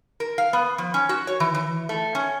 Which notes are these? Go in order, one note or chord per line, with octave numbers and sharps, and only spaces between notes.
A#4
F5
B3
F3
C#4
F#4
C#5
E3
E3
A3
C#4